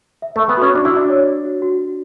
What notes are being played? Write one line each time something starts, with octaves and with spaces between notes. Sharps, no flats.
E5
A3 E5
B3
F#4
C#4
D4 F#4
E4
D4 F#4
C#5
C#5
F#4
F#4
F#4